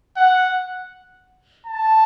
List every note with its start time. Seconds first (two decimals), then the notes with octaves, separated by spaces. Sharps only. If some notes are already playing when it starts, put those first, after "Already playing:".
0.17 F#5
1.67 A5